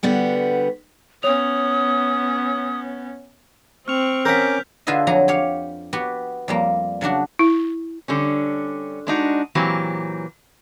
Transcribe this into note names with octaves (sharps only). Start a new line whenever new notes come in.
D3 G3 B3 F#4
B3 C#4 C#5 D#6 F7
C4 C#6 F6 F7
C#4 A#4 F#5 D6 G6 B6
D3 F4 G#4 B4 D#5 E5
F2 F#3 G#4 A#5
G4 C#5 F5
B3 F#4 G4 B4
F2 G3 A#3
C#3 F#3 D4 F#4
E4
D3 G3 C#4
G#3 D4 D#4 F#4
A#2 E3 F#3 C4 G4